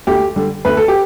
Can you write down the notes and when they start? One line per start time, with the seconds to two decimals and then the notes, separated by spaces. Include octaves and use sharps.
0.07 D2 G4
0.36 D3 G3
0.65 D2 B4
0.77 A4
0.88 G4